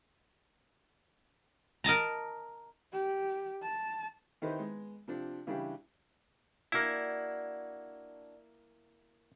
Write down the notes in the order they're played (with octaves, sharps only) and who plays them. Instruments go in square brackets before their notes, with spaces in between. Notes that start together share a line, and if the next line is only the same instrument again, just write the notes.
[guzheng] A#4 D#5 A5 A#5
[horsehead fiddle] G4
A5
[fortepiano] D#3 D#4 E4 G4 B4 C5
G#3 B3
C3 F3 C4 D4
C#3 E3 G3 D4 E4 G4
[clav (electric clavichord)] A#3 E4 [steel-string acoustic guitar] D4 F#4